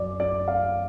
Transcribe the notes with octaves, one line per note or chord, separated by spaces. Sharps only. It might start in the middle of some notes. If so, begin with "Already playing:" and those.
Already playing: F#2 D5
D5
F5